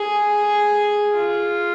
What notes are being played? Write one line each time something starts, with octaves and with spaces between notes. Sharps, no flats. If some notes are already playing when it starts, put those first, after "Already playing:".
Already playing: G#4
F4